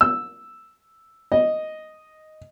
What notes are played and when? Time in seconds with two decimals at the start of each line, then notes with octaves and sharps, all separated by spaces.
0.01 E6
1.32 D#5